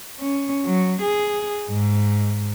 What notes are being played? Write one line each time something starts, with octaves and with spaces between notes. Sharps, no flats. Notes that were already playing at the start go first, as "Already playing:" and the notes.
C#4
F#3
G#4
G#2